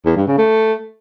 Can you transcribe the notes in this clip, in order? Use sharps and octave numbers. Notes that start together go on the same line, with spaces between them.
E2
G2
C#3
A3